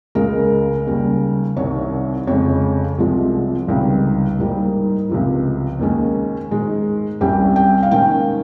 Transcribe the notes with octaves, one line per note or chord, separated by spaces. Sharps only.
C#2 C#3 G#3 A#4
D#2 C#3 G3
C2 C3 D#3 C#5
F2 C#3 G#3 C#5
C2 C3 F3 G#3
C#2 C3 D#3 G3
G#2 G3 A#3 D#4
C#2 C3 F3
D#2 D#3 G#3 C#4
G#2 D#3 G#3
C2 C3 G3 C#4 G5
G5
F5
G#2 D#3 A#3 C#4 G5